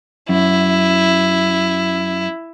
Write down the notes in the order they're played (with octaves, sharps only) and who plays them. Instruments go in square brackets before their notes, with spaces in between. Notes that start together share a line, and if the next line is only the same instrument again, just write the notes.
[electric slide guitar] F#2 [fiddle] E4